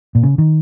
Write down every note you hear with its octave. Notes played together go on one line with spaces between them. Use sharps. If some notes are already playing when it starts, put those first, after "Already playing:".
A#2
C#3
D#3